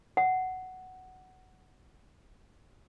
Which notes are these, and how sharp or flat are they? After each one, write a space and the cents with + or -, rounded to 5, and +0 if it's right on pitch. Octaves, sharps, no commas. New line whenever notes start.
F#5 +10